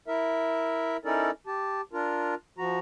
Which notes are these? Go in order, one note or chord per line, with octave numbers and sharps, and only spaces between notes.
E4 A#4 E5
C#4 D#4 E4 A4 A#4 D5
G4 A5
D4 F4 A#4
F3 F#4 A#5